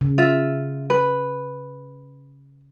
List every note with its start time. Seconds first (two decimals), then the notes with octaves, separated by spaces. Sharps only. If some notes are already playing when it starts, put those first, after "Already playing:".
0.01 C#3
0.18 F4 E5
0.90 B4